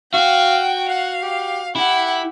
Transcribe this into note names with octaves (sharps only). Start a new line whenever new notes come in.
F#4 F5 G5
F5 F#5
G4
E4 G4 F#5